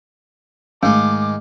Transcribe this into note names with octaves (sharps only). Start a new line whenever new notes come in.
G#2 D#3 G#3 A3 D6